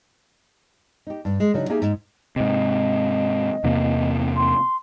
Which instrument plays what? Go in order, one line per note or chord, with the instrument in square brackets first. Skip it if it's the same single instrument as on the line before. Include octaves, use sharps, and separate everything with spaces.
[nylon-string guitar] D#4 G4
G2
G#3
C#3 E3 F#3 D4 D#4 F#4
A#3 D#4 G4 G#4 E5 G#5
G#2
[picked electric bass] G#2 C3 [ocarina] D#5
[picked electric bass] E2 C3 A#3
[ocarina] C6